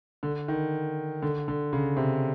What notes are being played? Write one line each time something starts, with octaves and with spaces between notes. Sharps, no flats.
D3
D#3
D3
D3
C#3
C3